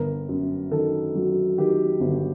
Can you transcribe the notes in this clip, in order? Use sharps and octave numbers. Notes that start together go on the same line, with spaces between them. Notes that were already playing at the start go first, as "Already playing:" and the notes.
Already playing: G1 A#4
F#2
D#3 A4
F#3
D#3 G4
G1